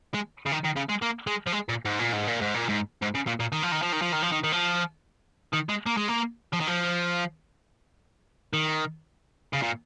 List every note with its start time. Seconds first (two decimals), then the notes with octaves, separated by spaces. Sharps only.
0.14 G#3
0.46 C#3
0.52 D#3
0.65 D#3
0.76 C#3
0.89 G#3
1.02 A#3
1.27 G#3
1.47 F3
1.53 G#3
1.69 A#2
1.85 G#2
1.99 A#2
2.13 G#2
2.27 A#2
2.41 G#2
2.54 A#2
2.69 G#2
3.02 G#2
3.15 C#3
3.27 A#2
3.40 A#2
3.52 D#3
3.63 F3
3.72 D#3
3.82 F3
3.93 D#3
4.02 F3
4.13 D#3
4.23 F3
4.32 D#3
4.44 D#3
4.52 F3
5.53 D#3
5.69 G#3
5.86 A#3
5.97 G#3
6.08 A#3
6.53 F3
6.60 D#3
6.67 F3
8.53 D#3
9.53 C#3
9.62 A#2